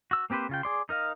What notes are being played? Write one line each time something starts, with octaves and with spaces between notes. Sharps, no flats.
F#4 E6
A#3 C4 G4 B4 C5
C#3 F4 G5
G#4 D5 C6
D#4 A#4 D#5 F5